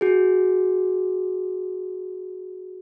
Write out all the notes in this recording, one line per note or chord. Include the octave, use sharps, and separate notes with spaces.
F#4 G#4